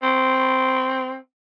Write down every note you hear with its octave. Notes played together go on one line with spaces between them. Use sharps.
C4